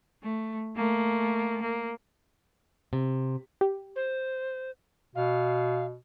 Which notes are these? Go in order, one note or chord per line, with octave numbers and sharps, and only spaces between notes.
A3
A3 A#3
A#3
C3
G4
C5
B2 F5